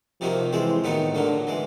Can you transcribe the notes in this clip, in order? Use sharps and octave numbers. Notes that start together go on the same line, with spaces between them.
C3 D#3 F3 F#3 A#3
E3 F3 G#3 C4
A2 D#3 F#3 B3 D#4
A#2 D3 F#3 A#3
E3 G#3